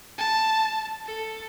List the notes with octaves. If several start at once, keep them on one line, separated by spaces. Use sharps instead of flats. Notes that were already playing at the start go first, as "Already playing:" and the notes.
A5
A4